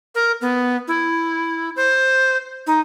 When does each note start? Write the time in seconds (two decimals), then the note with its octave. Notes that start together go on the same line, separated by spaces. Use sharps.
0.15 A#4
0.41 B3
0.88 E4
1.76 C5
2.67 D#4